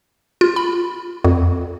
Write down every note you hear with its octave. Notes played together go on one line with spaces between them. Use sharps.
F4
B5
F2